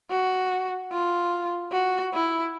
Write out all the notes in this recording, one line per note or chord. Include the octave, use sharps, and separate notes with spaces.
F#4
F4
F#4
E4